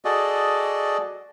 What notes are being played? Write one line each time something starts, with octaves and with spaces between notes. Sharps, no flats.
F#4 G#4 A4 D5 D#5